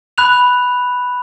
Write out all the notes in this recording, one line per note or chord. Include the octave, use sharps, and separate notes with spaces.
B5 F#6 F7